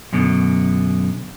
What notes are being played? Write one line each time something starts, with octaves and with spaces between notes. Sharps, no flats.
F#2 B2 D3